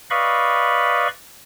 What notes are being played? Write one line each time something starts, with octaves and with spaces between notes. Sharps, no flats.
B4 D5 D#5 F5 B5 C#6